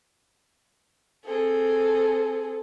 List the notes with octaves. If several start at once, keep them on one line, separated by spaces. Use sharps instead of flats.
C4 G#4 A4